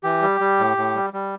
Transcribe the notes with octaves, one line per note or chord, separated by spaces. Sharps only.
E3 G4
G3
G3
A2
A2
G3
G3